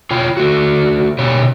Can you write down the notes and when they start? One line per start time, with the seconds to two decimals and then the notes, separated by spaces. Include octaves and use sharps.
0.11 F4 C#5 G5
0.37 A3 F#4
1.19 B2 G4 C#5